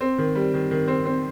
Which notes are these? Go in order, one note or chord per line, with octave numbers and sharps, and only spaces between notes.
C4
D#3
G3
D#3
D#3
C4
C4